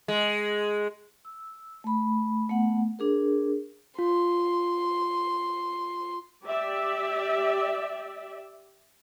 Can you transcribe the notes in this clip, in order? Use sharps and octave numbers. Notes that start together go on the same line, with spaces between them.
G#3
E6
A3 B5
A3 B3 F#5
D4 G#4 A#4
F4 C6
G4 D5 E5